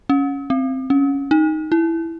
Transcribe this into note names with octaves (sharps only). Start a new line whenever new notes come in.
C#4
C4
C#4
D#4
E4